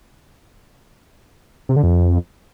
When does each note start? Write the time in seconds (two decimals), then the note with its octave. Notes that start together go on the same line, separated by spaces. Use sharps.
1.69 C3
1.76 D3
1.83 F2